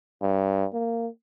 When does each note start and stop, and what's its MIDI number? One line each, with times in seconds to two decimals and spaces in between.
0.22 0.66 43
0.73 1.08 58